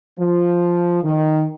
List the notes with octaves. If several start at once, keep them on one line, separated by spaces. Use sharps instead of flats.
F3
D#3